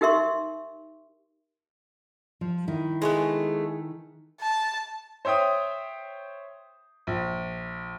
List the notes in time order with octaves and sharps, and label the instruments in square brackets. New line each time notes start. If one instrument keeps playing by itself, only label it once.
[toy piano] D#4 G4 A#4 E5 C6 C#6
[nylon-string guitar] F3
D#3 E4
[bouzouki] G#3 A3 B3
[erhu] A5
[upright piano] C5 C#5 E5 G5 D#6
A#1